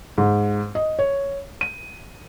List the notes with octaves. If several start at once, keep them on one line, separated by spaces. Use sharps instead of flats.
G#2
D#5
C#5
D#7